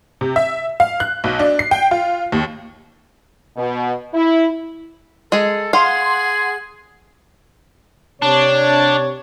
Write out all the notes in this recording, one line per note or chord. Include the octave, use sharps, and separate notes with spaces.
C3
E5
F5
F#6
B1
D4
C7
G5
F4
D#2
B2
E4
G#3 G#4 A4
G#4 F5 F#5 C6
C3 D4 C#5